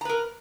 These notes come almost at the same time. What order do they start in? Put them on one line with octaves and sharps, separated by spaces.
A#5 B4 A#4